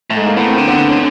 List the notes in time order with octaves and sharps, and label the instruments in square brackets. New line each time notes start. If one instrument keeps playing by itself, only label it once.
[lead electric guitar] A2
[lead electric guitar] G#2 [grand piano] A3
[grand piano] A#3
[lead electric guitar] A2 [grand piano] B3
[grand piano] C4
[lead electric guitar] D3 [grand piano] C4
[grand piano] B3
C4
C#4